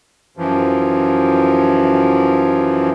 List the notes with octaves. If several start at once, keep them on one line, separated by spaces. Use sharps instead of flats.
F#2 E3 F3